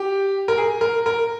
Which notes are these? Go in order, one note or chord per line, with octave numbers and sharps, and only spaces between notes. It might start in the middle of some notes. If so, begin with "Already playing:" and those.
Already playing: G4
A#4
G#4
A#4
A#4